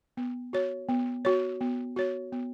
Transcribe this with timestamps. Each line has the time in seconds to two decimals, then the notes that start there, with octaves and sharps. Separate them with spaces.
0.17 B3
0.53 F#4 C#5
0.89 B3
1.25 F#4 C#5
1.61 B3
1.96 F#4 C#5
2.33 B3